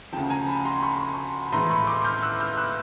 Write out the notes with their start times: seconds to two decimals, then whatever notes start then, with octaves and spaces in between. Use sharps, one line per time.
0.12 D2 C#3 F3 G5 A5
0.30 G#5 A#5
0.47 A5 B5
0.65 A#5 C6
0.82 B5 C#6
1.47 B5
1.52 A2 E3 G#3 A#5 C6
1.70 B5 C#6
1.87 C6 D6
2.04 F6 G6
2.23 E6 F#6
2.40 F6 G6
2.58 E6 F#6